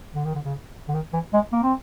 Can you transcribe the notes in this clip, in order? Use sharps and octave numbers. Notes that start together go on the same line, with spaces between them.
D3
D#3
D3
C#3
D3
D#3
E3
G#3
A#3
C4